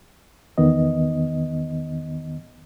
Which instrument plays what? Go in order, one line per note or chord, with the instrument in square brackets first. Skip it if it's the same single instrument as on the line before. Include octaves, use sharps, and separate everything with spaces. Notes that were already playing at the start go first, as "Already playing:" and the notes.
[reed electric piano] E2 D#3 B3 D#5